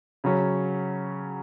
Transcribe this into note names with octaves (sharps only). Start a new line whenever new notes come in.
C#3 F#3 C#4